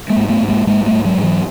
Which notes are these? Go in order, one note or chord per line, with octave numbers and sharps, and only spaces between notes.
G#3 A#3
G#2
A3 B3
G#2
G#3 A#3
G#2 G#3 A#3
G3 A3
G#2
F#3 G#3
G#2
E3 F#3